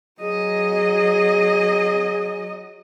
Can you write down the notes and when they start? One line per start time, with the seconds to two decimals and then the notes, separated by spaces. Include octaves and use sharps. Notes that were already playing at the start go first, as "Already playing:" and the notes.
0.21 F#3 G#4 D#5